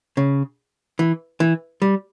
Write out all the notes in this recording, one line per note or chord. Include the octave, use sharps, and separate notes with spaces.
C#3
E3
E3
G3